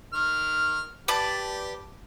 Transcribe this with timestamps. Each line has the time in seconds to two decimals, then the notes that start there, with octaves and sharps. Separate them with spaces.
0.13 D#3 F6
1.08 G4 B4 D5 A5